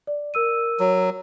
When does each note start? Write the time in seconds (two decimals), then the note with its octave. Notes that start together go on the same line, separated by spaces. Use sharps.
0.07 D5
0.34 A#4 E6 D#7
0.80 F#3